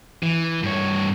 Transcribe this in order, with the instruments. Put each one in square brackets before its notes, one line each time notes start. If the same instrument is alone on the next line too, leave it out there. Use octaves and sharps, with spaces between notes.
[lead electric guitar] E3
G2 C#5